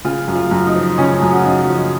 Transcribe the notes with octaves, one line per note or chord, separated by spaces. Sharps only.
C#3 F4
F#2
F4
F#2
D#4
F3
C#3 C#4
F#2
F#4
F4
F#2 D#4
F3